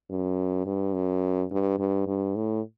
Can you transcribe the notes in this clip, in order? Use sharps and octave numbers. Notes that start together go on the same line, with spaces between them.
F#2
G2
F#2
G2
G2
G2
A2